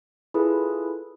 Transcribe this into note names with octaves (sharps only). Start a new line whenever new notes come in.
E4 F4 G#4 A4 B4